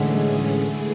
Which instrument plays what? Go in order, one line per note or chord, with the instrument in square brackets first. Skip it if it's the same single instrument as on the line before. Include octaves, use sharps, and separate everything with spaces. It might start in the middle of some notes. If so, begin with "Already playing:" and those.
Already playing: [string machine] A2 E3 A3 C#4 G#4 [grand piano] D3 G#3
[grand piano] G#3
G#3
[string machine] E3 A3 E4 G#4